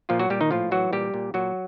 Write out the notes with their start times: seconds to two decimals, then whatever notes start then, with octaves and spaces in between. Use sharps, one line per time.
0.09 A#2 F3 F4
0.20 F#3 F#4
0.30 A#2 G3 G4
0.41 D#3 D#4
0.51 A2 F3 F4
0.71 E3 F#3 F#4
0.93 A#2 G3 G4
1.14 A#2
1.34 A#2 F#3 F#4